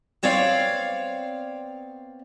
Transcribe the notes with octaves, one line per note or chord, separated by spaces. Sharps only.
B3 C4 C#5 D5 F5